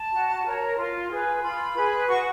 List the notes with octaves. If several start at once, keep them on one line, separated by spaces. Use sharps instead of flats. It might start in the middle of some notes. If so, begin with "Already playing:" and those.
Already playing: A5
F#4
A#4 C#5
F4
G#4 B4
F4 B5
G#4 B4
F#4 C#6